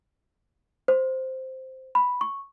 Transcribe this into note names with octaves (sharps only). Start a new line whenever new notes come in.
C5
B5
C#6